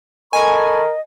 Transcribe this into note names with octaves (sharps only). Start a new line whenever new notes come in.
A4 A#4 D#5 G#5 B5 C#6